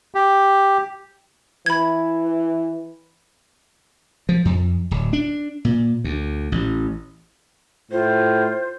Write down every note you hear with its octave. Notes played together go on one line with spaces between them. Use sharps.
G4
E3 B5 G#6
F3
F2
D1
D4
A#2
D2
A1
A2 F4 C5